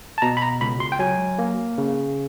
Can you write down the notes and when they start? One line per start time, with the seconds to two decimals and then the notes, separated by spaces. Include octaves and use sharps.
0.18 A5
0.22 B2 A#5
0.37 B5
0.42 A#5
0.61 C#2 B5
0.80 C6
0.92 G5
0.99 F#3 G#5
1.39 A#3
1.78 C#3